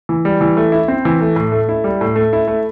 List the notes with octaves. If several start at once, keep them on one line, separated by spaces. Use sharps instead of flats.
E3
G3
E3
A3
E4
C4
E3
A3
A2
A3
E4
G3
A2
A3
E4
A3